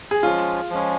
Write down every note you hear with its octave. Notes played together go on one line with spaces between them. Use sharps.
G#4
F3 G#3 C#4 F4
F3 G#3 C#4